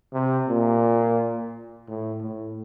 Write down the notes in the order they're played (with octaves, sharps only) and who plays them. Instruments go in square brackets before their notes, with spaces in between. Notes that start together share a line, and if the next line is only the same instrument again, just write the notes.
[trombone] C3
A#2
A2
A2